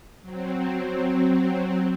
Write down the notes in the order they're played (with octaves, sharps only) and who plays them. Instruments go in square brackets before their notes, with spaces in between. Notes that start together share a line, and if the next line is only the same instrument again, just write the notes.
[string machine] F#3 C4